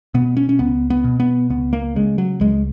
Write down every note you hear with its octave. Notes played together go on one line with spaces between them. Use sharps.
B2 B3
C#4
C#4
C#2 B3
B3
B2
B3
C#2 B3
A#3
C#3 G#3
F#3
C#2 G#3